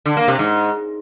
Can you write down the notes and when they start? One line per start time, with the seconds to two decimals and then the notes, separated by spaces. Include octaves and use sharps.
0.06 D3
0.17 A#3
0.28 C3
0.39 G#2